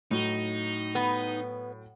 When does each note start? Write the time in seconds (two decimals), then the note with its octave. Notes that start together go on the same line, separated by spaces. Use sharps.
0.11 A2 F#3 D#4
0.95 B3